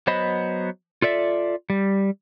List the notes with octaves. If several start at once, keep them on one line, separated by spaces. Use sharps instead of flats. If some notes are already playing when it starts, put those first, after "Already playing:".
F#3 B3 C5 D#5 B5
F4 A4 D5 E5
G3